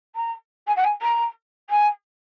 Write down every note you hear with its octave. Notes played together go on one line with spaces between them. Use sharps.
A#5
G#5
F#5
G#5
A#5
G#5